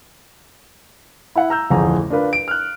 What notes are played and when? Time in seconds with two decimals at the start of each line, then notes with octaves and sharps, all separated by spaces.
1.36 E4 E5 F#5
1.50 A#5 E6 G6
1.70 D1 A1 F2 G#4 A#5
2.11 D4 F4 A#4 B4
2.33 D7
2.48 F6 F#6